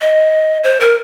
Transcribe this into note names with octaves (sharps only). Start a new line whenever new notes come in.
D#5
C5
A#4